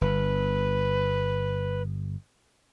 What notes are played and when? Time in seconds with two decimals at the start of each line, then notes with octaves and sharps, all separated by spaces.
0.01 G1 B4